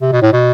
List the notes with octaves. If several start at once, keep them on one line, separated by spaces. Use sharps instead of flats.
C3
B2
A2
B2